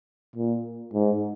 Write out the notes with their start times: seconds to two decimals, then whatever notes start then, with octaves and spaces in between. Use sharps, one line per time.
0.36 A#2
0.93 G#2